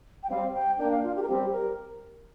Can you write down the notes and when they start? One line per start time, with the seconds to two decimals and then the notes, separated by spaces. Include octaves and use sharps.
0.23 G5
0.30 G3 C4 F5
0.54 G5
0.79 A#3 D4 G5
0.91 F5
1.04 F4
1.16 G4
1.23 A#4
1.28 G3 C4 G4
1.53 A#4